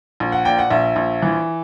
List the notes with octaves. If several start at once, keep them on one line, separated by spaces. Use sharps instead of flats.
A#1
F#5
A#2 G5
F#5
A#1 E5
A#1
E3